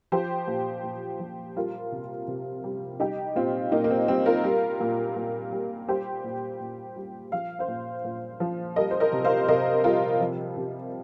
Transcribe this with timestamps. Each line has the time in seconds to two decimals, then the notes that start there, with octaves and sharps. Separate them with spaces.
0.12 F3 G4 C5
0.47 A#2
0.84 A#2
1.19 F3
1.56 G3 F4 A#4
1.92 C3
2.28 C3
2.64 G3
3.00 G3 D#4 G4
3.36 A#2 C4 F4
3.72 A#2 A#3 D#4
3.84 A#3
3.91 C4
4.08 G3 C4
4.26 F4 A#4
4.44 G3
4.81 A#2
5.16 A#2
5.52 G3
5.88 G3 G4 C5
6.24 A#2
6.60 A#2
6.96 G3
7.32 F3 F5
7.59 C5 F5
7.68 A#2
8.04 A#2
8.40 F3
8.76 G3 A#4 D#5
8.91 C5
9.00 A#4 D#5
9.13 C3
9.25 C5 F5
9.48 C3 A#4 D#5
9.84 G3 F4 A#4
10.20 F3
10.57 C3